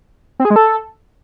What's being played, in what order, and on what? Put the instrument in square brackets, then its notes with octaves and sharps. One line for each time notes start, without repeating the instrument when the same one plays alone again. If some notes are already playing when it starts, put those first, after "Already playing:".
[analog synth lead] C4
G#4
G#3
A4